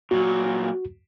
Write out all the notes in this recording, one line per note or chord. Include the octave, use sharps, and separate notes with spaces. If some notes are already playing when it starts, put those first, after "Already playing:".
A#2 F#3 F#4